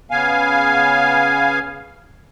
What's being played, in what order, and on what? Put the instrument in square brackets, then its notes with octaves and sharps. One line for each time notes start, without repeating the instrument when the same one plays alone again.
[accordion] C#3 B3 F5 G#5